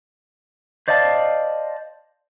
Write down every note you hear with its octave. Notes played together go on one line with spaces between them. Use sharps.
C5 D5 D#5 F5 A5